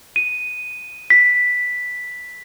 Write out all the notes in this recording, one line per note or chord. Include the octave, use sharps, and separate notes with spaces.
D#7
B6